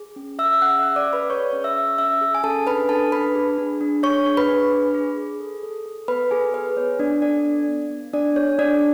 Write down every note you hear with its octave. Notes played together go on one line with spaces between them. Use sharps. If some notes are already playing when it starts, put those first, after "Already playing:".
Already playing: G#4
C#4
G#4 E5 E6
C#4 F#5 F#6
E5 E6
C#4
D5 D6
G#4
B4 B5
G#4 C#5 C#6
C#4
E5 E6
C#4
C#4 E5 E6
G#4
G#5
C#4 A4 A5
D4 B4 B5
D4 A4 A5
D4 B4 B5
G#4
D4
D4
G#4 C#5 C#6
D4
B4 B5
D4
G#4
G#4
G#4
A4
A4
A4
B3 B4 B5
G#4 A4 G#5
F#4 B4
B3 C#5
B3 D4 D5
D4 A4 D5
A4
B3
B3
D4 D5
G#4 C#5
D4 D5